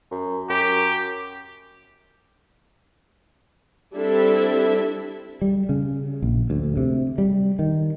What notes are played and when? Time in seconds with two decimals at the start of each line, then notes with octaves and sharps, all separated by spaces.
0.11 F#2
0.50 F#2 G4
3.94 G3 C4 D4 E4 A4 E5
5.42 G3
5.69 C#3
6.22 A#1
6.50 D2
6.77 C3
7.18 G3
7.59 D#3